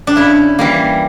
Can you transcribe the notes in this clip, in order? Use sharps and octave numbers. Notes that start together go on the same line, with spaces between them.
D4
C#3 E4
E3 G3 A#3